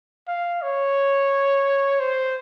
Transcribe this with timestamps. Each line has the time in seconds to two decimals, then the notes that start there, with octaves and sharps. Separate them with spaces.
0.28 F5
0.62 C#5
2.00 C5